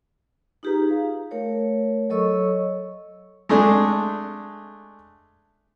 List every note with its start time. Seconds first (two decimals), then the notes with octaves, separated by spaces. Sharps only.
0.63 D#4 F4 G4 G#4 B4 A#5
0.90 F5
1.31 A3 A#4 C#5
2.10 F#3 A4 C#5 D#5 C#6 E6
3.49 G#3 A3 D4